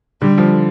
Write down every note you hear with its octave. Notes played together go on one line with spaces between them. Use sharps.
D3 G3
F3